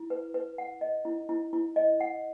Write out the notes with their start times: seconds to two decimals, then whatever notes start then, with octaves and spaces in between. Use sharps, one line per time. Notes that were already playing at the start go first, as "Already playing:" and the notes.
Already playing: E4
0.10 B4
0.34 B4
0.58 F#5
0.81 D#5
1.05 E4
1.29 E4
1.53 E4
1.76 D#5
2.00 F#5